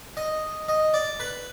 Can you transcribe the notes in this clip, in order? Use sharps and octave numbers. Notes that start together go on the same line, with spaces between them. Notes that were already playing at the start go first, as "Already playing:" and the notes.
D#5
D#5
D5
B4